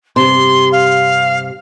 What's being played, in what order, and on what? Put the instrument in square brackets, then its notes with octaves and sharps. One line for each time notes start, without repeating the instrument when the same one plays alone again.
[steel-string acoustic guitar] G2 C3 [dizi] C6
[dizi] F5